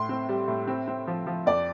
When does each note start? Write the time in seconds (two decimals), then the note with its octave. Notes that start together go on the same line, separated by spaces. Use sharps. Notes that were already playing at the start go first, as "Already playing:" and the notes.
Already playing: A2 C6
0.09 C4
0.29 G3
0.48 A2
0.68 C4
0.88 C4
1.07 F3
1.27 F3
1.46 F2 D5